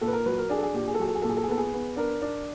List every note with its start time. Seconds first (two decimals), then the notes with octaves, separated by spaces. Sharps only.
0.01 A#2 A4
0.08 B4
0.13 A#4
0.26 F#3 B4
0.38 A#4
0.50 D4 G#4
0.58 A4
0.63 G#4
0.74 A#2 G4
0.88 G#4
0.94 A4
0.99 F#3 G#4
1.08 A4
1.15 G#4
1.22 A#2 A4
1.29 G#4
1.37 A4
1.43 G#4
1.48 B3 A4
1.58 G#4
1.73 B3
1.97 D4 A#4
2.22 D4